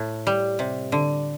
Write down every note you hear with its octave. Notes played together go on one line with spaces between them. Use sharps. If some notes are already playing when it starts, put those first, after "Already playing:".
Already playing: A2
G3
C3
D3